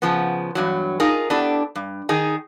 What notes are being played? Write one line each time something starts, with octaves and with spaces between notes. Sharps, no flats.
C#3 F3 B3
E2 G2 F#3
D#4 F4 G#4 A#4
B3 D4 E4 G4 A4
G2
D#3 D#4 G#4